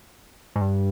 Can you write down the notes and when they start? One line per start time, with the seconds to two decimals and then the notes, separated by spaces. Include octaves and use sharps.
0.56 G#2
0.61 G2